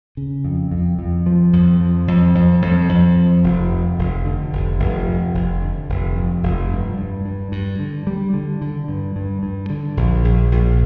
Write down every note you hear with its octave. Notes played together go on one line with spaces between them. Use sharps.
C#3
F2
F2
F2
F3
F2
F3
F2
F2
F2
F2
F3
F1
F2
F1
D3
F1
F1
F2
F1
D3
F1
F2
F1
G2
G2
G2
G2
D3
G3
D3
D3
G2
G2
G2
D3
A#1
A#1
A#1